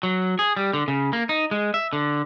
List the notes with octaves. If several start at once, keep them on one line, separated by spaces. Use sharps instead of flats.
F#3
G#4
G3
D3
C#3
A#3
D#4
G#3
E5
D3